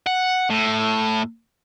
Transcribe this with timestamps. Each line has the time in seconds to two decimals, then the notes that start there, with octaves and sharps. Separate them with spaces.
0.07 F#5
0.50 A2